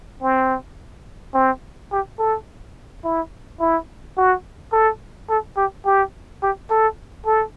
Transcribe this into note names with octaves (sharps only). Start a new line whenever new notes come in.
C4
C4
G4
A4
E4
E4
F#4
A4
A4
G4
G4
G4
A4
A4